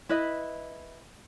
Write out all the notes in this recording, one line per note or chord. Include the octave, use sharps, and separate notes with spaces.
E4 B4 D#5